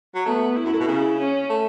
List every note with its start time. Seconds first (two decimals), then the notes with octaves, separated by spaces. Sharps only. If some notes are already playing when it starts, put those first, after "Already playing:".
0.15 F#3
0.26 A3 B3
0.56 E4
0.64 F#2
0.72 A2
0.79 B2
0.87 C#3
1.18 C#4
1.49 A3